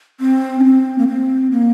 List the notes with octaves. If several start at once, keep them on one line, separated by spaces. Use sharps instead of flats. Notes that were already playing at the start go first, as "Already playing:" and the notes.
C4
C#4
C4
A#3
C4
A#3